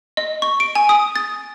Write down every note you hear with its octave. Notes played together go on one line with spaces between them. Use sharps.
D#5
C#6
D7
G#5
D#6
A6